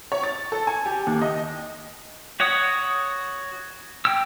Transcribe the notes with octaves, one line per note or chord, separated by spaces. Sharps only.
C#5
A6
A4
G#5
G4
D#2
D#5
F#4 C#5 F#5 D#6
G5 E6